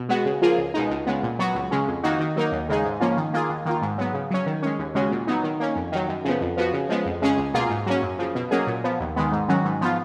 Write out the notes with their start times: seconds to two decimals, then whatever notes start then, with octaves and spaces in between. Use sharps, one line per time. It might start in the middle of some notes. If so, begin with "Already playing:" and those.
Already playing: B2
0.09 G#3 B3 F#4
0.25 C#3
0.42 F3 A#3 F4 G#4
0.58 C#2
0.74 B2 G#3 D#4
0.90 C#2
1.06 C#3 G#3 B3
1.23 A#2
1.39 F#3 B3 F#4
1.55 C#2
1.71 C#3 G#3 C#4
1.88 F2
2.04 D#3 A#3 D#4 F#4
2.20 D#3
2.36 F#3 A#3 D#4
2.52 D#2
2.69 C#3 G#3 D#4 G#4
2.85 G#2
3.00 F3 A#3 C#4 F4
3.17 D#3
3.34 A#3 F4 G#4
3.50 D#2
3.65 D#3 A#3 F4
3.82 G#2
3.98 F#3 B3
4.14 C#3
4.30 F#3 C#4
4.46 D#3
4.63 G#3 C#4
4.79 D#2
4.95 C#3 G#3 C#4 F#4
5.11 A#2
5.27 F#3 B3 D#4
5.44 D#3
5.60 A#3 C#4
5.76 F2
5.92 D#3 F#3
6.09 F#2
6.25 C#3 F3 B3
6.41 F2
6.57 F3 B3 F#4
6.73 C#3
6.89 F3 G#3 B3
7.06 F2
7.22 C#3 G#3 C#4 G#4
7.37 C#2
7.54 B2 A#3 F4 G#4
7.70 G#2
7.86 F#3 A#3 C#4
8.02 F#2
8.19 C#3 F3
8.35 B2
8.51 F#3 A#3 C#4 G#4
8.67 A#2
8.84 F3 B3
9.00 D#2
9.16 D#3 G#3 B3
9.32 G#2
9.48 D#3 F#3 C#4 F#4
9.65 G#2
9.81 F3 B3 F4